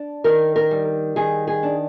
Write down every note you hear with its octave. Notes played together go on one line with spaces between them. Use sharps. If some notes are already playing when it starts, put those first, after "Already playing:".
Already playing: D4
D#3 A#4
A#4
G3
D#3 G#4
G#4
D4